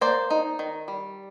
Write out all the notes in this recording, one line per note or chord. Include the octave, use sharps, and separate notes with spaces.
A#3 C5 D5
D#4
D#3
G3